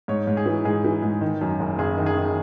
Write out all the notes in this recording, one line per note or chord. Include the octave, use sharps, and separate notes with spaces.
G#2 C#5
G#2
G#4
E3
G#2 G#4
E3
G#2
D#3
F#2
F#1
F#1 G#4
D#3
G#4
D#3